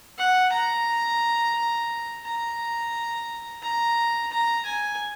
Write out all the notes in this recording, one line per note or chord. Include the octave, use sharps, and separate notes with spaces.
F#5
A#5
A#5
A#5
A#5
G#5